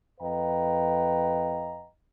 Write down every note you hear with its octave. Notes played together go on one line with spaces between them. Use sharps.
F2 B4 D#5 F5 G5 A#5